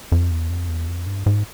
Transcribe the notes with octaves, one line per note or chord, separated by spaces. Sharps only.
F2
E2
F2
E2
F2
G2
G#2